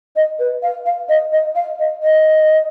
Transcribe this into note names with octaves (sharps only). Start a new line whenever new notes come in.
D#5
B4
F5
F5
D#5
D#5
F5
D#5
D#5